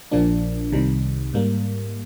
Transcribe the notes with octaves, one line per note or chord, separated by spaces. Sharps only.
A#1 A#2 F3 A#3 D4
C2 C3 D#3 G3
G#2 G3 A#3